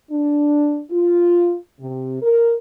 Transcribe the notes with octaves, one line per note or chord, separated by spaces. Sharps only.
D4
F4
C3
A#4